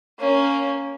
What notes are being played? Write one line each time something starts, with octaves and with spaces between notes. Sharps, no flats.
A#3 C#4